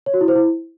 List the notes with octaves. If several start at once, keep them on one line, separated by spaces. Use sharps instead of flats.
C#5
F#4
E4
C5
E4